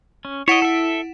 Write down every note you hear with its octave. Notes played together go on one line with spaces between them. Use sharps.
C#4
E4 C#5 D#5 F#5 D7
A4 E5